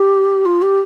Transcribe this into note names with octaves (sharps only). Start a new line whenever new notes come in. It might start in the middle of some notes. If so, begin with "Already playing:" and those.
Already playing: G4
F4
G4